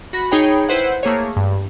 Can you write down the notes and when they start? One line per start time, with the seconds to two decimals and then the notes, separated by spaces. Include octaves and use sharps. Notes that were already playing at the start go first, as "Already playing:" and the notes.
0.13 F#4 B5 A#6
0.31 D#4 G#4 C#5 G5 B5
0.69 E4 B4 C5 F#5
1.03 A3 A#3 G#4 C#5
1.37 G2